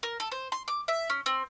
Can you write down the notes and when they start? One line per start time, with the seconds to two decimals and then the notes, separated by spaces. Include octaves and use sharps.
0.03 A#4
0.20 A4
0.32 C5
0.52 C6
0.68 D6
0.88 E5
1.10 C#4
1.26 C4